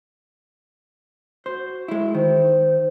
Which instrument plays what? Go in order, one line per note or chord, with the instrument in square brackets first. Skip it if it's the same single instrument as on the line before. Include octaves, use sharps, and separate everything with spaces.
[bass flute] F#4 [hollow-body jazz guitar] C5
[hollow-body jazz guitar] G#3 E4
[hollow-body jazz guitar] D#3 [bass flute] C5